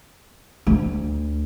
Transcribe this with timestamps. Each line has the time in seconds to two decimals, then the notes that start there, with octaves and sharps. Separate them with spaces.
0.67 D2